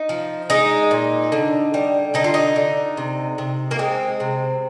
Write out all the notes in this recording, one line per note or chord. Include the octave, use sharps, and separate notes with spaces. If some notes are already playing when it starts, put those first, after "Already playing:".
Already playing: D#4
F3
G#3 D#4
A#2
D3
G3
D3 D#4
F4
D#4
D3
C3
C3
A#3
G#3 C4
C3